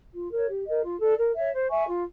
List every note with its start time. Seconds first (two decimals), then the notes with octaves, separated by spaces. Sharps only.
0.13 F4
0.30 A#4 C#5
0.48 G4
0.65 A#4 D#5
0.82 F4
1.00 A4 D5
1.17 A#4
1.35 C#5 E5
1.52 C5
1.70 E5 G#5 C#6
1.86 F4